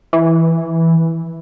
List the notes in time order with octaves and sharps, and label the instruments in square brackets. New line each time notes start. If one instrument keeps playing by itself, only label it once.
[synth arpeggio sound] E3